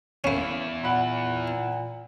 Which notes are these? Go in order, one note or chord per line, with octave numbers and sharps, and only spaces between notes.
E2 A#3 C#4 E4
A#2 F#5 B5